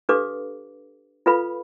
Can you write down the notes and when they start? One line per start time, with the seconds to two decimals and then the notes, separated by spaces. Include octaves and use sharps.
0.09 D4 G4 A4 B4 F5 D6
1.26 F4 A4 B4 F5 B5